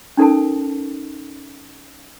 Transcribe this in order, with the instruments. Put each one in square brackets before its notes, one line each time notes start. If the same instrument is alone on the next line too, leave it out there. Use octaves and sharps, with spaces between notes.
[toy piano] C#4 D#4 A4 A#4 A5